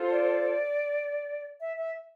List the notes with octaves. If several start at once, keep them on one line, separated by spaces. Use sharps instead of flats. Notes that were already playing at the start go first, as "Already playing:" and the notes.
Already playing: F4 A4 C5
D5
E5
E5